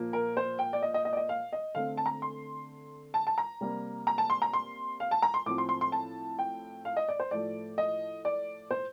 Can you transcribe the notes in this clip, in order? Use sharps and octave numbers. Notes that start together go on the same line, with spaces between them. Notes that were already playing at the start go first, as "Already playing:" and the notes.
Already playing: A#2 F3 A#3
A#4
C5
G5
D5
D#5
D#5
D#5
D5
D#5
F5
D#5
D3 A3 C4 F5
A5
A#5
C6
A5
A5
A#5
C3 G3 A#3
A#5
A5
C6
A#5
C6
F5
A5
A#5
C6
A2 F3 C4 D6
C6
C6
C6
A5
G5
F5
D#5
D5
C5
A2 F3 A3 D5
D#5
D5
C5